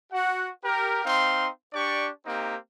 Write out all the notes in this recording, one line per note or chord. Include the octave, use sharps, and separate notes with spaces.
F#4 F#5
G4 A#4
C4 D#4 F5 C6
D4 G4 D5 C#6
A#3 C4 D#4 G4